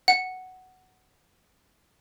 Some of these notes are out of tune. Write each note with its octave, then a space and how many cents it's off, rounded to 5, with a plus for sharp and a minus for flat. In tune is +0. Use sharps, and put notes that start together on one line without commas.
F#5 +5